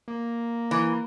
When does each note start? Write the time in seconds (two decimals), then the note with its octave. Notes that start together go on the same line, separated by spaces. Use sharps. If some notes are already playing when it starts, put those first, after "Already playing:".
0.08 A#3
0.71 E3